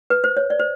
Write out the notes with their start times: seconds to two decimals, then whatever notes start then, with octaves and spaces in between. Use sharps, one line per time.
0.10 B4
0.24 C5
0.37 C#5
0.50 D5
0.60 C5